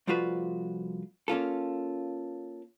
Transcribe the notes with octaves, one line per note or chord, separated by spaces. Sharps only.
C2 F3 A3 F4 F#4 B4
A#3 C#4 F4 A4